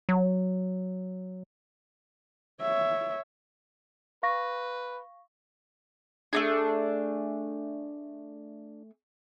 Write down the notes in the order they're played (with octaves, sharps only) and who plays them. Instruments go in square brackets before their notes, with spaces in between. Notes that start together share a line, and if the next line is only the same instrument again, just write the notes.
[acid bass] F#3
[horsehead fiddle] C#5 E5
[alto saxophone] B4 [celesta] F5 C#6 A#6
[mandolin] A3 D#4 G#4 [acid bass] D4